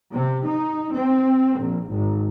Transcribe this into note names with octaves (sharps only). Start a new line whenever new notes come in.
C3
D#4
C4
A#1
G#1